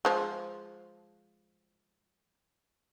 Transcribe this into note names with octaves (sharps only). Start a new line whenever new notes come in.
F3 G#3